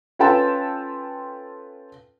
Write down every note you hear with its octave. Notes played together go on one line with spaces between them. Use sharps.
C#4 F4 A4 B4 G5 A5